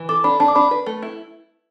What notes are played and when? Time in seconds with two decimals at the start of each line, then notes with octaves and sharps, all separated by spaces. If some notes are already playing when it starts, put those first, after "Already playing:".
Already playing: E3
0.09 A4 D6
0.24 D4 B5
0.40 D4 A5
0.48 D6
0.55 D4 B5
0.71 B4
0.86 A3
1.02 E4